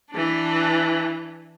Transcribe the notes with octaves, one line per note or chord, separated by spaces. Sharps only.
E3 D4